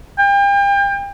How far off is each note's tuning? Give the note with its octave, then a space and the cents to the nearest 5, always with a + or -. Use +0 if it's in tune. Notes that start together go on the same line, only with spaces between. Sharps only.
G5 +35